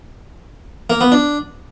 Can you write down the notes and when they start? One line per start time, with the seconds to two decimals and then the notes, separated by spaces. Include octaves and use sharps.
0.90 A#3
1.01 B3
1.12 D4